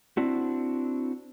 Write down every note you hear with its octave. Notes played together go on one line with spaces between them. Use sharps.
C4 D4 E4 F#4